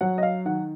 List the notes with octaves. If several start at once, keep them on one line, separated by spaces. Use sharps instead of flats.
F#3 F#5
D#5
F5
D#3 F#5